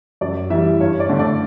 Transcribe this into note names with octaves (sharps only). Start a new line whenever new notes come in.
F#2 D5
E3 G3 E5
G2 C#5
D5
D3 A3
D5